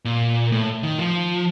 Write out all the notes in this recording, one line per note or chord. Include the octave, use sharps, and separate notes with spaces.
A#2
A2
D#3
F3